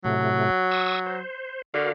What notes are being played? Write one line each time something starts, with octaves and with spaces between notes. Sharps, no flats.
A2 C3 F#3 A3
C#6 D#6 E6
C5
D3 F#4 A#4 F5